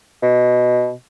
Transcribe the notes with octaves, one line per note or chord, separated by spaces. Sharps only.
B2